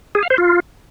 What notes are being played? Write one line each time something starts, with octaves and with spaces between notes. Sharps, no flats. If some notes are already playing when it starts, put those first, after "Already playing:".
G#4
F5
C5
F4